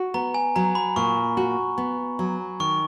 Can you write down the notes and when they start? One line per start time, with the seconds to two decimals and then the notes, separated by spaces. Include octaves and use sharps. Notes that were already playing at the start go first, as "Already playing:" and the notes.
Already playing: F#4
0.14 B3 A#5
0.34 G#5
0.56 F#3 A#5
0.75 B5
0.96 A#2 C#6
1.37 F#4
1.78 B3
2.19 F#3
2.60 D#3 C#6